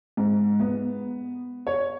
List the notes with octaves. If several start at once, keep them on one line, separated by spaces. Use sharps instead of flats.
G#2
B3
C#5